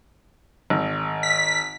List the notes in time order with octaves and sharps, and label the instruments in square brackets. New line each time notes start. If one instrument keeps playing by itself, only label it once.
[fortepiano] G#1
[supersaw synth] B6